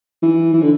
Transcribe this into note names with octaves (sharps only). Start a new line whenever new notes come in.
E3
E3
D3